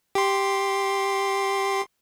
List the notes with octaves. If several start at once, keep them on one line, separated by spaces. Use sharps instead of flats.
G4 C6